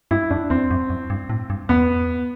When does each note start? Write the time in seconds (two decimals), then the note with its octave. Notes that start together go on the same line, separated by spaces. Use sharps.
0.11 G2 E4
0.30 F#2 D4
0.50 E2 C4
0.71 F#2
0.90 F#2
1.10 G2
1.30 A2
1.50 G2
1.69 E2 B3